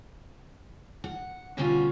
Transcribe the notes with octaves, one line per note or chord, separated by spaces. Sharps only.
F#5
B2 D3 G3 C#4 F4 F#4